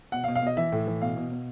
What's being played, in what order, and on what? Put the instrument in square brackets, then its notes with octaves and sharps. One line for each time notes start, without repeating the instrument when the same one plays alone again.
[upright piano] B2 F#5
F5
B2
F5
B2 D#5
E3 E5
A2
E3
B2 F5
B2
B2